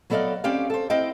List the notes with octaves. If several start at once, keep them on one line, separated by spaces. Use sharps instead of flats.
F#3 B3 A4 D5 D#5 F5
C4 C#4 G4 D5 F5
A4 C5
C4 E4 D#5 F5 G5